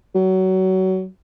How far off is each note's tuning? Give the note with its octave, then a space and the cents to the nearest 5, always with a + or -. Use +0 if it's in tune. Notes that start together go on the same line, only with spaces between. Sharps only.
F#3 +25